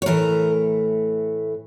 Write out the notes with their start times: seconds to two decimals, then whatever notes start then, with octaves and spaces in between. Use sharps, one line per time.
0.02 C#5
0.06 A2 E3 A3 A#4